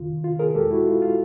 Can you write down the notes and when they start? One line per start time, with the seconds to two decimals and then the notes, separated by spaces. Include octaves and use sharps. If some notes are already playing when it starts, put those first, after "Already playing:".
Already playing: F2 C3 D#3 F4
0.24 F4
0.39 G#4 A#4
0.55 E2 B2 G#3 G4 A4
0.71 E4 F#4
0.87 F4
1.02 F4